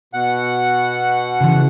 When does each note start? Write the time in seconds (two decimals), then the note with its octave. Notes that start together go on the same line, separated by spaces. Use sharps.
0.14 B2 F#5
1.41 C#3 E3